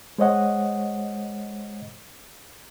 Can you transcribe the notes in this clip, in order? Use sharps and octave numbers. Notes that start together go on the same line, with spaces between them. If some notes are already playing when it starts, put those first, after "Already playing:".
G#3 C5 C#5 D#5 F#5